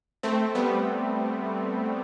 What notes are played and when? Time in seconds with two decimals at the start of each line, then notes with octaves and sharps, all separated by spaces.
0.23 A3 C4
0.55 G3 B3